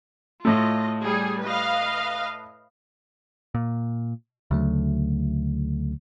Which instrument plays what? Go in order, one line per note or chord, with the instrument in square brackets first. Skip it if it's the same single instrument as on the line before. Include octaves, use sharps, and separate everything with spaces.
[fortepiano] A2 A3 [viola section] F4 D#5
[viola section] G3 G#4 G#5
B4 D#5 F5
[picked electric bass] A#2
[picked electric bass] D2 [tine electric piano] C#3 F#3 A3